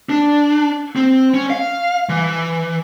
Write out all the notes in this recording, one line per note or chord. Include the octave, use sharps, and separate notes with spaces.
D4
C4
C#4
F5
E3